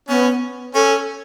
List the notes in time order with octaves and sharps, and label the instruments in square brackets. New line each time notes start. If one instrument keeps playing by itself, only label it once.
[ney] B3 [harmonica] C#4
[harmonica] C#4 [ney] A4